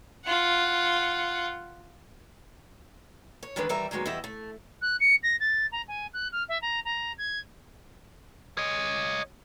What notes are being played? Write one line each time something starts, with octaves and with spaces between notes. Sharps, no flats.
F4 F#5
C#5
D#3 E3 G#3 B3 D4 B4
D#2 E3 G3 A#4 E5 A#5
D#3 F#3 G#3 A#3 B3
E2 G3 E4 G4 D#5 E5
A3
F#6
C#7
A#6
A6
A#5
G#5
F#6
F6
E5
A#5
A#5
G#6
C#5 D#5